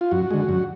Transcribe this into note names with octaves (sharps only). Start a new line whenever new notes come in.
F4
F#2 F#4
D3 G#3
F#2